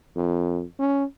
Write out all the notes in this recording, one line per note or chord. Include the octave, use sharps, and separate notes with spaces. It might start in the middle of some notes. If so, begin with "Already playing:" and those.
F2
C#4